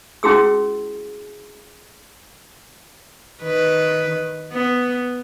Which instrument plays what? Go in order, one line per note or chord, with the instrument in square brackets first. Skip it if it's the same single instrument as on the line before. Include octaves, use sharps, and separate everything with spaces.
[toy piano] C#4 E4 F#4 G#4 E6
[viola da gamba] D#3 B4
B3